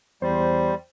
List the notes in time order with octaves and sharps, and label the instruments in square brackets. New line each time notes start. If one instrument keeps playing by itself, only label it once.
[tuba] E2 [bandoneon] G3 [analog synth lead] C5